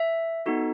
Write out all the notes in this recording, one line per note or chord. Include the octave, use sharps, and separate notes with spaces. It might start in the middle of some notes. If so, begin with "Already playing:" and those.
Already playing: E5
B3 D#4 F#4 A4